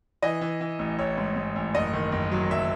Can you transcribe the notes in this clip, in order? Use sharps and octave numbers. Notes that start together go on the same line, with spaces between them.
E3 D#5
E3
E3
A1
A1 C#5
G#2
G#2
A1
F#1 D#5
D#3
F#1
F#3
F#1 E5